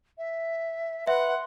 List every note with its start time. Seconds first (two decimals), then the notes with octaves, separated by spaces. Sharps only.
0.18 E5
1.07 B4 E5 F#5 C6